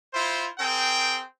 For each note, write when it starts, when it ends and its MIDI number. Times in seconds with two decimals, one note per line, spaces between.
0.14 0.47 64
0.14 0.47 65
0.14 0.47 72
0.58 1.21 60
0.58 1.21 68
0.58 1.21 70
0.58 1.21 79